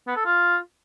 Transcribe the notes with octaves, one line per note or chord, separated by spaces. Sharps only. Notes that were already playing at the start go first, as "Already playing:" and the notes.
B3
A4
F4